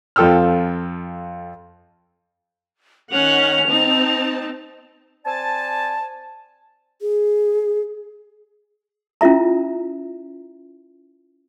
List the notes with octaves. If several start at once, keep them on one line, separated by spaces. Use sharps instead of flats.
F2 F4 A4 G5 E6 F6
D#3 C#4 F#5 F7
C4 D#4 A5
C4 D5 G#5 A5
G#4
C#4 E4 F4 E5 A#5